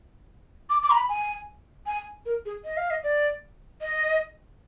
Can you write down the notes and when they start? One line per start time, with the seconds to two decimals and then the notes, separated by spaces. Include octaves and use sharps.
0.70 D6
0.83 D6
0.90 A#5
0.96 B5
1.09 G#5
1.87 G#5
2.26 A#4
2.45 G#4
2.65 D#5
2.77 F5
2.90 D#5
3.04 D5
3.81 D#5